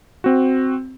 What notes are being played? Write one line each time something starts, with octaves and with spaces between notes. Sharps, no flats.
C4 F#4